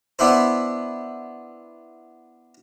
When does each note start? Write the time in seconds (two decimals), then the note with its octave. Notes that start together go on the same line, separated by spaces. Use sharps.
0.19 B3 D4 E4 C5